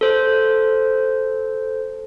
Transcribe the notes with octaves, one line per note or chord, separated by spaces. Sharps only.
A4 C5